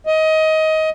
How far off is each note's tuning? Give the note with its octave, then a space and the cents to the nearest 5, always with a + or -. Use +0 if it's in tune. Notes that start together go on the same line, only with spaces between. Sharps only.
D#5 +20